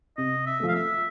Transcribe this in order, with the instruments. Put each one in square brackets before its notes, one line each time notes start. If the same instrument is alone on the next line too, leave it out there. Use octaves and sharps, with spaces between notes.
[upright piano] C3 [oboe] D#5
[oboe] E5
[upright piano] F3 A3
[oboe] F5
E5